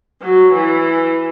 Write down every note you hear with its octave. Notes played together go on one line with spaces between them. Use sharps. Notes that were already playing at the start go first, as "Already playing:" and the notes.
F#3
E3